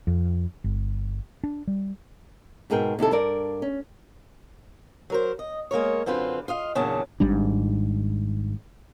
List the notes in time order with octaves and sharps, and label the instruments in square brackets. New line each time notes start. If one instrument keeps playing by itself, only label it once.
[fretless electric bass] F2
G1
D4
G3
[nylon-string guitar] G#2 B2 G#4 A#4 G5
D#2 C3 E4 A4
G2 D4 A#4 D5
C#4
[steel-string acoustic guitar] F#3 A#4 C5
D#5
G#3 A#3 A#4 C#5
F#2 D3 C4 F4 B4
F4 D#5 F5
E2 A#2 C#3 F#3 D4 A5
[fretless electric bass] G#1 G#2 G3 D4